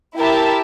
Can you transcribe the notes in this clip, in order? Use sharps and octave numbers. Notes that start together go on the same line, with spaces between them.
E4 G4 A#4 E5 A5